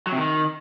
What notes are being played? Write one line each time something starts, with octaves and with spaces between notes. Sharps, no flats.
F#3
C3
D#3